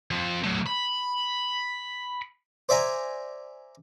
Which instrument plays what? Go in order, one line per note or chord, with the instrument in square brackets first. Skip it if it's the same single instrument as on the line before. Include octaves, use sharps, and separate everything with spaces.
[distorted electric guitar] F3 C4
F#3 A3
B5
[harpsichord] C5 D5 E5 G#5 A#5